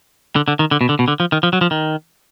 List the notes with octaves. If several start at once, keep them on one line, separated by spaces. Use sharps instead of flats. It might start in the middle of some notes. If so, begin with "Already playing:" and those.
D3
D3
D#3
D3
B2
D3
B2
D3
F3
D#3
F3
F#3
F3
D#3